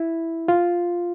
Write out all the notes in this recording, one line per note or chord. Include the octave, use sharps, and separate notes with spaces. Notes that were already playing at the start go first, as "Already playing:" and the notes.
Already playing: E4
F4